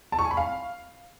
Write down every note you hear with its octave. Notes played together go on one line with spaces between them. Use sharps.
A5
C#6
G#5
B5
F5